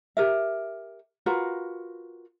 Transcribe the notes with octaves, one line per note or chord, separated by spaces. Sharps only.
G4 A#4 E5
F4 F#4 A#4 B4